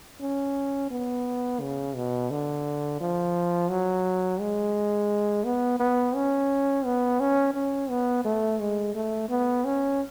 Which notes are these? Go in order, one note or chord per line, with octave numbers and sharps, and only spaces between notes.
C#4
B3
C#3
B2
D3
F3
F#3
G#3
B3
B3
C#4
B3
C#4
C#4
B3
A3
G#3
A3
B3
C#4